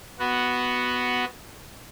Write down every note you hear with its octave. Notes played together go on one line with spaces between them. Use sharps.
B3 F#4